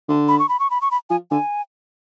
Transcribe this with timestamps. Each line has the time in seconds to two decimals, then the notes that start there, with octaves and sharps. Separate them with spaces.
0.08 D3
0.28 B5
0.39 C#6
0.49 B5
0.60 C#6
0.71 B5
0.81 C#6
0.91 B5
1.10 F3 G#5
1.31 D3 G#5